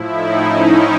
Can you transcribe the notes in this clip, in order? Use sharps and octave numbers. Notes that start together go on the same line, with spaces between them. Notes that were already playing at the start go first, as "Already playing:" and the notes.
Already playing: A2 F3 E4
D#4
C#4